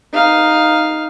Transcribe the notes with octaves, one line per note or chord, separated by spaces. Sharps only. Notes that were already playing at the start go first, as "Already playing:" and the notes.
D#4 F5